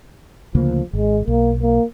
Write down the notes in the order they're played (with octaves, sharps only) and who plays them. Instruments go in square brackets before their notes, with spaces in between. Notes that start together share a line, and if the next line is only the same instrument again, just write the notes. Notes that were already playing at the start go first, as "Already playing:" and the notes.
[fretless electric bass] D2 C#3 A#3 [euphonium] F3
[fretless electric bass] G#1 [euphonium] G#3
[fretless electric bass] B1 [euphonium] A#3
[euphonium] A#3